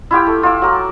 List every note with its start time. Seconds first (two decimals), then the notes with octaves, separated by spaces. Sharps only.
0.11 E4 F4 G4 G5
0.27 A3
0.43 F4 E5 D6
0.62 F#3 A#4 A5